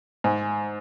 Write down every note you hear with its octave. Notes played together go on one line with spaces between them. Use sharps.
G#2